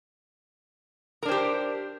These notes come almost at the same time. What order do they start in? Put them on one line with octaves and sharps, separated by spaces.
A#4 D4 C5 G4